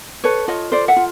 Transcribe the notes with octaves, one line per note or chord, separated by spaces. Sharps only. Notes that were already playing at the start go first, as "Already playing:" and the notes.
A4 B4 C#5
F4 C#5 D#5
A4 C5 D5
E5 F#5
F4